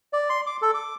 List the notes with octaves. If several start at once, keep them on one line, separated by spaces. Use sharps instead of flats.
D5
C6
D6
A4
D6